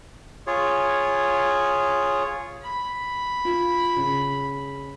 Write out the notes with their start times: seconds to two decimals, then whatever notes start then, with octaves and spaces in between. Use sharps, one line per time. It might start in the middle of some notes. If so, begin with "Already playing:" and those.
0.47 F4 G#4 C#5
2.62 B5
3.45 F4
3.96 C#3